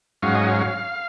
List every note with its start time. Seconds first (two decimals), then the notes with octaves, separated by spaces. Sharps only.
0.22 G#2 F#3 C#4 F5
0.35 D#5
0.48 F5